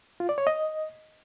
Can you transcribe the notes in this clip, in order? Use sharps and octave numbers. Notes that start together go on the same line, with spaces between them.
F4
D5
C#5
D#5